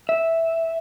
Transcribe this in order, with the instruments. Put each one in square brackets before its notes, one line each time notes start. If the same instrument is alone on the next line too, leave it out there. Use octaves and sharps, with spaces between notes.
[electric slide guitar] E5